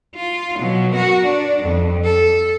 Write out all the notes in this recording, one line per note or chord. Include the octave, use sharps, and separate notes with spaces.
F4
B2 F#3
F#4 A#4
D4
F2
A4